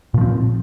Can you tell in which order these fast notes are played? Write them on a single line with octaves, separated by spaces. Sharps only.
A#2 F3 C4